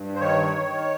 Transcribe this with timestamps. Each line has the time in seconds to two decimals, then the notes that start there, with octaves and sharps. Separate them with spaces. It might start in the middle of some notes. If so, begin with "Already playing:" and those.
Already playing: G2
0.15 C5
0.20 D#3 C#5
0.55 D#3